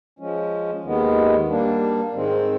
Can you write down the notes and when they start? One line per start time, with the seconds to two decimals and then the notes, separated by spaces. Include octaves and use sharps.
0.19 F3 G#3 C#4
0.84 D#2 D#3 G#3 B3
1.49 G3 A#3 D4
2.13 G#2 D#3 G#3 C4